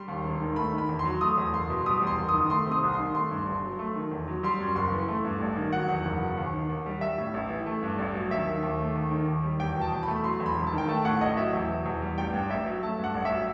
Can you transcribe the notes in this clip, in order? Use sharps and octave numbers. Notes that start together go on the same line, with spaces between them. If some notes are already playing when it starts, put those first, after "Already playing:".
Already playing: G3 C6
D#2
E1
D#3
A3 B5
D#3
B5
E2
C6
F#3
A3 D#6
E2
F#1 C6
B2
G3 D#6
E2 C6
F#1
D#6
D#3
A3 C6
C3
D#6
C2
C6
D#3
A3 C6
G2
G1
F#3
A3
D#3
E2
F#3
G3 C6
F#2
F#1 C6
E3
A3
G2
A1
D#3
F#3 F#5
E2
F#1
B2
D#2
D#3
D#2
G3
G3 E5
A2
A1
E3
A3
G2
A1
F#3
D#2 E5
D#3
D#2
A3
D#2
D#3
D#2
G3
E2 G5
B2
A5
E2
B5
A3
F#3 C6
E2
B5
E1
A5
D#3
G5
A3 A5
A2 F#5
A1 D#5
F#3 E5
E2
B2
E2
G3
A1 G5
G2
A1 E5
F#3
A3 A5
G2
F#5
A1
E5
F#3